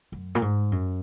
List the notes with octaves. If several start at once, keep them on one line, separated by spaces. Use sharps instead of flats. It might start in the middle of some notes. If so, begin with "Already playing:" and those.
F#2
A#2
G#2
F#2